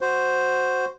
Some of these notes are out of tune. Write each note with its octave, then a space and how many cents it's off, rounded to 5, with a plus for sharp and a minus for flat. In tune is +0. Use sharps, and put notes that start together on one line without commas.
F#4 +0 C5 +0